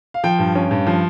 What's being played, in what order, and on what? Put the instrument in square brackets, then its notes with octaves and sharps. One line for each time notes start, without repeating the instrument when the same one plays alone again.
[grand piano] F5
F3 G5
G2
C#4
G2
F3